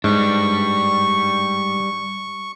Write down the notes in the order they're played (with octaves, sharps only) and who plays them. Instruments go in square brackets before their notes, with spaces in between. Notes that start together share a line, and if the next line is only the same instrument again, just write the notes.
[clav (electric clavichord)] G#2 [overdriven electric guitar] G3 D4 [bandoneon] C#6